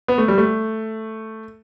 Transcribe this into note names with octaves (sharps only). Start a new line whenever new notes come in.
B3
A3
G3
A3